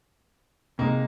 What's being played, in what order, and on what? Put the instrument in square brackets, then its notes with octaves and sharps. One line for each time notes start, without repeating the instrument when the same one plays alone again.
[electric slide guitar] C3 G#3 [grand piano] A#3 D#4